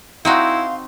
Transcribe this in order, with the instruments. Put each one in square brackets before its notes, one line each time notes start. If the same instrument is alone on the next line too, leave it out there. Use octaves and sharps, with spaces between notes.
[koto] C4 D#4 F#4 [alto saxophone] E4 [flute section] F5 C6